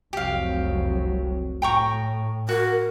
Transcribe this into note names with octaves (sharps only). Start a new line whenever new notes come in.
F1 C2 F#3 G4 F5
A2 G5 A#5 C#6
F#4 A#4